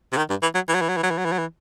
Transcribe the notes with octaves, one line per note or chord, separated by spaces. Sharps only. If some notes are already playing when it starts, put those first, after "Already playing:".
C3
D#3
G2
E3
F#3
E3
F#3
E3
F#3
E3
F#3
E3
F#3
E3
F#3
E3